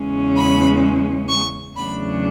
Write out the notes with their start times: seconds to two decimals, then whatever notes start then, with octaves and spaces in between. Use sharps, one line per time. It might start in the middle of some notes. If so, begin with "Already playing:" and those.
Already playing: E2 C#3 G#3 C#4
0.36 B5
1.28 C#6
1.75 E2 C#3 F#3 A3 D4 B5